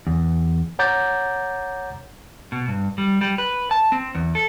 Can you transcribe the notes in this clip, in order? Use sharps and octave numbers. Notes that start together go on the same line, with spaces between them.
E2
C#5 F#5 A#5 D6 G6 A6
B2
G2
G3
G3
B4
A5
C4
E2
A4